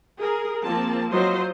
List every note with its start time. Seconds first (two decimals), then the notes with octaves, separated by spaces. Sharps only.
0.20 G#4 A#4
0.62 F3 A#3 C4 F4 A5
1.10 F#3 F4 C5 D#5